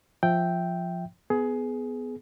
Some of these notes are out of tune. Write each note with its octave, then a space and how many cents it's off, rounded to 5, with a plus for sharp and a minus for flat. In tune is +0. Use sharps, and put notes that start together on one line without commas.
F3 +0 E5 +0 G5 +0
B3 +15 G#4 +20